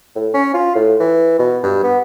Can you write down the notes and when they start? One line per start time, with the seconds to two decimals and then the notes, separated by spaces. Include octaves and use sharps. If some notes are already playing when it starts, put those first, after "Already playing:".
0.15 A2
0.34 C#4
0.54 F4
0.75 A2
1.00 E3
1.39 B2
1.63 G2
1.83 B3